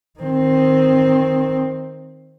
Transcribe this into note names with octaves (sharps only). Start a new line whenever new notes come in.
D#3 C4